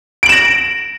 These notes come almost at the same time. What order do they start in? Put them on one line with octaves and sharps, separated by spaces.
D7 F#7 E7 A#6